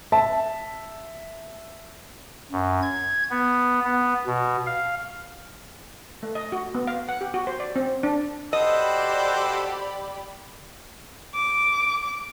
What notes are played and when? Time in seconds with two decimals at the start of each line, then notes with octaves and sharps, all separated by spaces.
0.12 E5 A5
2.52 F#2
2.83 G#6
3.31 B3
3.85 B3
4.26 B2
4.67 F5
6.23 A3
6.35 D#5
6.52 F#4
6.75 B3
6.87 F5
7.09 F#5
7.21 G4
7.34 F#4
7.47 C5
7.60 D5
7.76 C4
8.03 D4
8.53 F#4 G4 A4 C5 D5 D#5 B5
11.34 D6